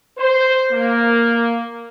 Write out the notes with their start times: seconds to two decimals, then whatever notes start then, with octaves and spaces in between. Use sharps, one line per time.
0.18 C5
0.72 A#3